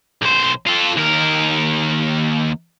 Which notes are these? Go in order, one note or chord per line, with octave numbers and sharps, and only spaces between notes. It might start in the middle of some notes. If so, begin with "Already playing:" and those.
B1 C5
F4 A4
D#2 A#4